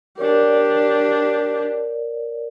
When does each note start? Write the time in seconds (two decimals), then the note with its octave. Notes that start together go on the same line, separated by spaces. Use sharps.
0.18 D4 G4 A#4 C#5 D5